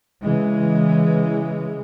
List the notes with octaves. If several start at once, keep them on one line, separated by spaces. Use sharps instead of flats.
C#3 E3 G#3